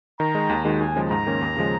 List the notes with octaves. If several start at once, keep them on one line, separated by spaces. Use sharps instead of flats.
D#3 A#5
G#3 D#4
D#2
D#3 G#3 D#4 F#4
D#2 G#5
C#3 F3 G#3
G#2 A#5
D#3 A#3 C#4
D#2
C#3 F3 G#3